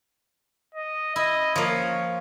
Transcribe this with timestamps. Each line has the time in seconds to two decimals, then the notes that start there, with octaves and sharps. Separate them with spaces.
0.75 D#5
1.16 E4 D#5
1.56 F3 A#3 C#5